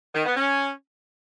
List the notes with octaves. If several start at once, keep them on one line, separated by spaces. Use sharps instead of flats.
D#3
B3
C#4